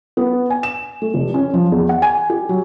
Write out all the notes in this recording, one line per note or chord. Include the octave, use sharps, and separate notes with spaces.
B3
G#5
E7
A3
F1
C#4
F3
E2
F#5
G#5
G4
F#3